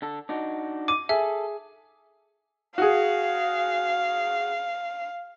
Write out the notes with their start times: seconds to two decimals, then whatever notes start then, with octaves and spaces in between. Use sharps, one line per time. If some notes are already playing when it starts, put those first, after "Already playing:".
0.02 D3 A4
0.29 D4 D#4 F#4
0.88 D6 D#7
1.09 G#4 A4 E5
2.78 F#4 G#4 F5